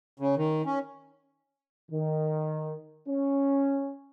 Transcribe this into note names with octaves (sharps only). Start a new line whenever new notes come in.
C#3
D#3
C#4
D#3
C#4